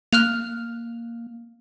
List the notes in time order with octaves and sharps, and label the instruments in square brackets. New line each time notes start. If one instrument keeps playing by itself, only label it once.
[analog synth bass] A#3 [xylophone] F6 F#6 F7